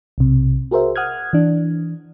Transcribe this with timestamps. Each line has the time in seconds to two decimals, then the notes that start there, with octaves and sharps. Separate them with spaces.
0.18 B1 C3
0.71 F#4 G#4 A#4 C5 E5
0.96 F#5 D#6 F6 F#6 G#6
1.33 E3 D4